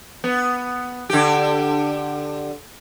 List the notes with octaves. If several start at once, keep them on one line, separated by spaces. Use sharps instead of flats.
B3
D3 G4